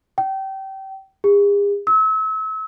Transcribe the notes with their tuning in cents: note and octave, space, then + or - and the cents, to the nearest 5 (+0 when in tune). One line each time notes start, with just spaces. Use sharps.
G5 -25
G#4 -45
E6 -35